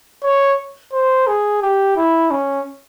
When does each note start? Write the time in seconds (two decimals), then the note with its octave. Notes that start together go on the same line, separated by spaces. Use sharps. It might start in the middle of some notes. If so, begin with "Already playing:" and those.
0.24 C#5
0.93 C5
1.27 G#4
1.62 G4
1.97 E4
2.31 C#4